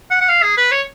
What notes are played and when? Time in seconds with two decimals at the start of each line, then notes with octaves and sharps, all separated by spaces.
0.11 F#5
0.21 F#5
0.29 F5
0.42 G#4
0.57 B4
0.71 C#5